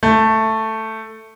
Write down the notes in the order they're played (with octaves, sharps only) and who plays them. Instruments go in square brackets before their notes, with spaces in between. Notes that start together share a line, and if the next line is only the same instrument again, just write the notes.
[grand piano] A3